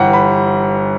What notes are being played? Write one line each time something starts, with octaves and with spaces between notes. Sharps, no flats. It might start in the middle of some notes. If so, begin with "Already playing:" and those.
Already playing: G1 G2 E3 F#5 G5
B5